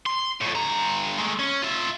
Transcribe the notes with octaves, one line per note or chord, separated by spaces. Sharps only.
C6
F2 A2
G2 A#5
G#3 A3
C#4
F4 E5